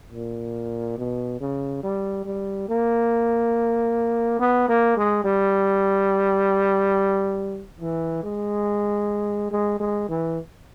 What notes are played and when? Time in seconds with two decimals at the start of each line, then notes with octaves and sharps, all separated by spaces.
0.12 A#2
0.98 B2
1.40 C#3
1.83 G3
2.25 G3
2.69 A#3
4.39 B3
4.68 A#3
4.97 G#3
5.24 G3
7.80 E3
8.23 G#3
9.51 G#3
9.80 G#3
10.09 E3